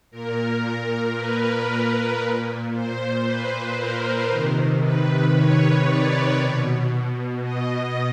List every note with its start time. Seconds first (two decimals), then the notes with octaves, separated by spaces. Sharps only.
0.11 A#2 A#4
1.16 B4
2.20 A#2
2.72 C5
3.25 B4
3.77 A#4
4.29 C3 D#3
4.81 B4
5.34 C#5
5.86 D5
6.38 B2
7.42 D#5